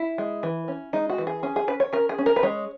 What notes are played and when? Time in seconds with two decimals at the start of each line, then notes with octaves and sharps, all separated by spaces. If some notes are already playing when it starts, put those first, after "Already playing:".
Already playing: E4
0.18 G#3
0.43 E3
0.68 C#4
0.93 G#3 D#4
1.10 F#4
1.18 E3
1.27 G#4
1.43 C#4 G#4
1.56 G#4
1.68 C#4 B4
1.80 C#5
1.93 C#4 A#4
2.09 G#4
2.18 C#4
2.26 A#4
2.36 B4
2.43 G#3 C#5